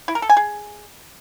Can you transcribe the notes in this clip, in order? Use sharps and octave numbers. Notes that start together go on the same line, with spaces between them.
E4
A#4
A4
G#5
G#4